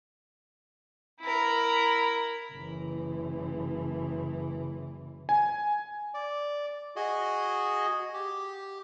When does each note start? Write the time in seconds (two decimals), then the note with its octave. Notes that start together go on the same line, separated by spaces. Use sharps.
1.21 E4 A#4
2.52 F#1 E3
5.29 G#5
6.14 D5
6.96 F#4 G#4 D#5
8.14 G4